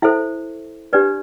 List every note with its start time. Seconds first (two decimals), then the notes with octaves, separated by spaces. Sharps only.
0.02 E4 A4 C5 E5
0.93 D4 G4 B4 D5